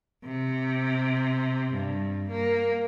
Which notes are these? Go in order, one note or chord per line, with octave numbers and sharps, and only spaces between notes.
C3
G2
A#3